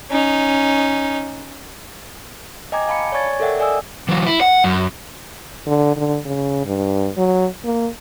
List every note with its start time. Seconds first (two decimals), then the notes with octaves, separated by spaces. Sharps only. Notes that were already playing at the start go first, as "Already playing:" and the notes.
0.10 C#4 D#4
2.72 D#5 G5 G#5 A#5 D6 G#6
2.88 F5 A5 B5 C#7
3.12 C#5 D5 G#5 C#6 G#6 A6
3.40 A4 A#4 D5 E5 F#5 G5
3.59 D5 D#5 G#5 D#6 E6
4.09 E3 F#3
4.27 E4
4.41 F#5
4.64 F#2
5.67 D3
5.96 D3
6.26 C#3
6.66 G2
7.17 F#3
7.64 A#3